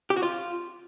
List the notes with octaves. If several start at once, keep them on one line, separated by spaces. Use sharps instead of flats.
G4
F#4
F4